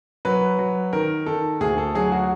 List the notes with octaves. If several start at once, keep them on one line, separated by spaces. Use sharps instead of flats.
F#3 B4
F#3
D#3 A#4
D#3 A4
D2 G#4
A4
F#3 G#4
F#4